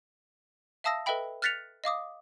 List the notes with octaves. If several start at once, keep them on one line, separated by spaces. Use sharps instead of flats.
E5 F5 A5 D#6 E6 A#6
A4 B4 D#5 E5 G5 B5
F6 F#6 A6 B6 C#7 F7
D#5 F5 D6 D#6